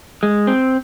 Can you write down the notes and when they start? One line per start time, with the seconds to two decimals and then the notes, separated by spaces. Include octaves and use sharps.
0.23 G#3
0.47 C4